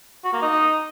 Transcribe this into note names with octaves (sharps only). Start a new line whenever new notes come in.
F#4
A#3
D#4